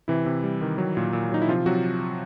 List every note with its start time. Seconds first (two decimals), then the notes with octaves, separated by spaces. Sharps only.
0.08 C3 E3 E4
0.26 C3
0.43 G3
0.61 D#3
0.78 F#3
0.97 A#2
1.13 A#2
1.31 F#3 D#4
1.42 E4
1.48 C3 F3 F4
1.66 C3 F#3 F#4